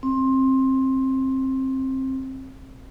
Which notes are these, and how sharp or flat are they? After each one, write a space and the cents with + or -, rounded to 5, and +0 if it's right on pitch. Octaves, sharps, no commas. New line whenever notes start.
C4 +20